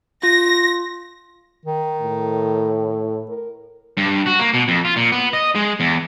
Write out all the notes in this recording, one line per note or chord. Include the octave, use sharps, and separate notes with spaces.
F4 A#6
D#3
A2
A#4
G2
F#4
A#3
B2
F2
F4
A#2
B3
D#5
G#3
E2